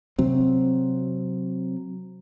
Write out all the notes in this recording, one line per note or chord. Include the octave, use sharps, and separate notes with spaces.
C3 F#3 C4